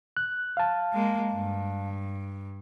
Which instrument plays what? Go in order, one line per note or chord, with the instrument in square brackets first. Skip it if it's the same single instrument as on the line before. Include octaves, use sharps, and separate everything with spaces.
[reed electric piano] F#6
F5 A5
[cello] G#3 A#3
G2